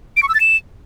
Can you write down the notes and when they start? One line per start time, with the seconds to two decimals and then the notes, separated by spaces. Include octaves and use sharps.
0.16 D7
0.22 C#6
0.28 E6
0.34 A6
0.40 E7